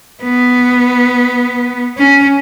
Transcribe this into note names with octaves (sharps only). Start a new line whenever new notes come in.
B3
C#4